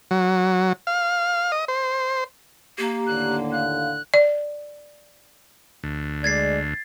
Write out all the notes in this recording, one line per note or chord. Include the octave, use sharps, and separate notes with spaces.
F#3
F5
D#5
C5
A#3 G4 A#5
D#2 A2 D3 F#6
F5 F#6
D5
D2
G#3 D5 G#6 A6 C7